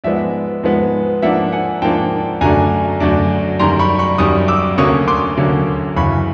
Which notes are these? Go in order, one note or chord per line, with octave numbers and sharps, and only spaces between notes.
G#2 F3 G#3 B3 D5 E5
G#2 F3 G#3 B3
G#2 F3 A#3 D4 E5 F#5
F#5 G#5
G#2 F3 A#3 D4 G5 A5
F#2 D3 F#3 A3 D4 G#5 A#5
F#2 D3 F#3 A3 D4
F#2 D#3 G3 A#5 C6
B5 C#6
B5 C#6
F#2 D#3 G3 C#6 D#6
D6 E6
D2 D3 F#3 A#3 C#4 C#6 D#6
C6 D6
D2 D3 F#3 A#3 C#4
F#2 C#3 E3 B5 C#6